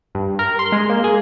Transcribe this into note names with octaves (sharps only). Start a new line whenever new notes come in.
G2
A#4
C6
G#3
A#3
G#4